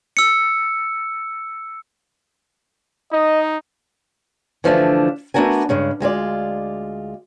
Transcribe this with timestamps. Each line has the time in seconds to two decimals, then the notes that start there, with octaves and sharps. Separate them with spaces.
0.17 E6 C#7
3.12 D#4 D#5
4.64 D3 E3 F3 A3 C#4 D4
5.34 A3 B3 D4 F#4 A#4 G#5
5.69 G2 C#3 G#3
6.00 D2 G#3 F4 D5